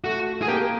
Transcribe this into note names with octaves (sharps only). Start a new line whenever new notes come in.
A3 F#4
G#4
A#3 G4